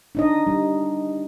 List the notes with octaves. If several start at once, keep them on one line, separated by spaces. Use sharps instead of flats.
D4 D#4 D#5
G3